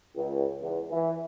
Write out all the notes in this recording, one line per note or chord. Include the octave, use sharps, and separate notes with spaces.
C#2
E2
E3